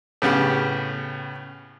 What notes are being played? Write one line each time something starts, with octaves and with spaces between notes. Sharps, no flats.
A2 C#3 B3 G4